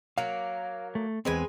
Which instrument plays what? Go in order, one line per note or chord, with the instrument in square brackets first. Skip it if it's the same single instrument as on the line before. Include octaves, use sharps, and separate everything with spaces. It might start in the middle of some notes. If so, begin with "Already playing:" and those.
[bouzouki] F#3 A#3 [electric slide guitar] F5
[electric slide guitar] A3
[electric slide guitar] E2 C4 [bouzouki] G#3 B4 G#5